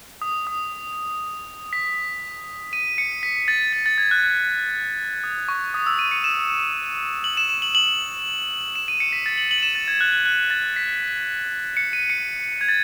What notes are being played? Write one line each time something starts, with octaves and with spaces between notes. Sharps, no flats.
D#6
D#6
B6
D#7
C#7
B6
A6
A6
A6
G#6
F#6
F#6
D#6
C#6
D#6
E6
D#7
C#7
E7
F#7
E7
E7
F#7
F#7
E7
D#7
C#7
B6
A6
F#7
F#7
D#7
E7
A6
G#6
F#6
F#6
F#6
A6
B6
C#7
D#7
C#7
G#6
A6